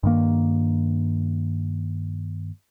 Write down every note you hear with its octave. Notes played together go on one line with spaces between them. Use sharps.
G2 D#3 A#3